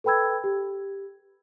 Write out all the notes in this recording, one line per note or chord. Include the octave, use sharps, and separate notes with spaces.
A4 B4 G5 B5 E6 G#6
G4